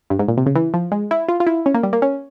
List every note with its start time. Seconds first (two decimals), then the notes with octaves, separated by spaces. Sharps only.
0.10 G2
0.19 G#2
0.28 A#2
0.37 C3
0.46 C#3
0.55 E3
0.74 F3
0.92 G#3
1.11 E4
1.28 F4
1.40 F4
1.47 E4
1.66 C#4
1.74 A#3
1.83 G3
1.93 A#3
2.02 C#4